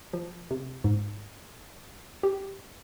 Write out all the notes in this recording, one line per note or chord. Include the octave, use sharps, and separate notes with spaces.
F3
C3
G#2
G4